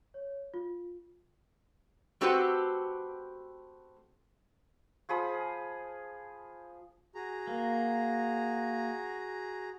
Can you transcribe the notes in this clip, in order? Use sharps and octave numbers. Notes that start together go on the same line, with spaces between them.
C#5
F4
A3 C4 F#4 G4 A4 B4
F3 G#4 B5 D#6
F#4 G#4 A#5
A#3